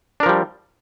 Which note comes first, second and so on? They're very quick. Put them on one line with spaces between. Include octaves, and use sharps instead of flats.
D4 A#4 F3 G3